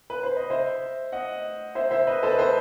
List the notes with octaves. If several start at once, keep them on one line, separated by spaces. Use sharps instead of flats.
B4
C5
D#5
C5 E5
D#5 F#5
C5 E5
C5 E5
B4 D#5
A4 C5
B4
A4 C5